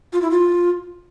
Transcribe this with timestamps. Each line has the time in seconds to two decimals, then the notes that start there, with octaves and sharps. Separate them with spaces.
0.13 F4
0.22 E4
0.31 F4